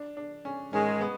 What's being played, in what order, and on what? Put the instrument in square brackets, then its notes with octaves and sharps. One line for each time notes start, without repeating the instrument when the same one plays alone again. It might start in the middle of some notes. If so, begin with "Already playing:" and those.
Already playing: [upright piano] D4
D4
C#4
[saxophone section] G#2 D#3 G#3 [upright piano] C#4
[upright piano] B3